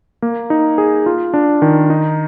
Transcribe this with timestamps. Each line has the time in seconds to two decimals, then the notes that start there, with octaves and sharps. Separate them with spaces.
0.22 A#3
0.50 D#4
0.78 G#4
1.06 F4
1.34 D4
1.62 D#3
1.90 D#4